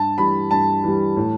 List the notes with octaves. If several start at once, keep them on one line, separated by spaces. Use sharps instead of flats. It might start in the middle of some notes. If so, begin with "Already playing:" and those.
Already playing: G2 A5
E3 G3 B5
G2 A5
E3 G3
A2